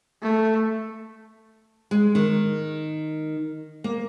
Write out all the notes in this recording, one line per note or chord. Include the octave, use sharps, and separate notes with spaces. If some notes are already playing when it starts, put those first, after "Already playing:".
A3
G#3
D#3
A#3